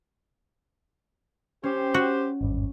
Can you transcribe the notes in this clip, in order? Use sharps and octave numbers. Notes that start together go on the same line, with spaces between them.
C#4 G4 C5
F#4
G#1 E2 G2